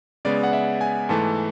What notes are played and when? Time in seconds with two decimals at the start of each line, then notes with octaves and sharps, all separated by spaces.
0.25 C#3 G#3 B3 D5
0.43 F#5
0.53 E5
0.81 G#5
1.09 G#2 E3 A3 A5